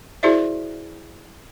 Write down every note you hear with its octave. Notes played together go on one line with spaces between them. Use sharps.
E4 F#4 G#4 C5 D5 E5